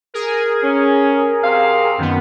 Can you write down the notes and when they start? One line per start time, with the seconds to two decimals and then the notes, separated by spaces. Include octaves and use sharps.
0.14 G#4 A#4
0.63 C#4
1.43 C3 C4 F5
1.98 F#2 D#3 B3